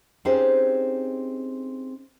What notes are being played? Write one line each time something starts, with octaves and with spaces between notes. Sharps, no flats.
C4 C#4 D#4 G4 G#4 C5